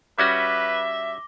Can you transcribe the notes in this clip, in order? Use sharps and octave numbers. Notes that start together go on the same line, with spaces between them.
G3 C#4 F#4 B4 E5 D6 A#6 G7